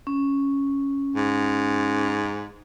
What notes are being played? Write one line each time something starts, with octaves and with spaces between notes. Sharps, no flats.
C#4
G#2